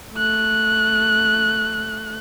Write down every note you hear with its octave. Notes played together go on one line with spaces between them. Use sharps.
A3 F#6